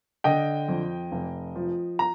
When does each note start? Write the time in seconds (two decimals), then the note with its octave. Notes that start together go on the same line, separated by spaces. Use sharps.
0.24 D3 D#5 G5
0.68 F2
1.12 F1
1.56 F3
1.99 A#5